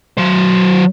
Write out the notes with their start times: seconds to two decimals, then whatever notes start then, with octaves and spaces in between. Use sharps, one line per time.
0.18 F#3 C5